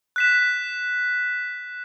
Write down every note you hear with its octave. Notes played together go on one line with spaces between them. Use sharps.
F#6 B6 E7